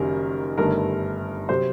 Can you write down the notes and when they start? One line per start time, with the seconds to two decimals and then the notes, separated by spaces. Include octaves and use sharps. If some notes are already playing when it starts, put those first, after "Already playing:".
Already playing: F#1 F#2 D#3 G3 A#4
0.58 G1 G2 D#3 A3 A#4
1.49 C3 F#3 C5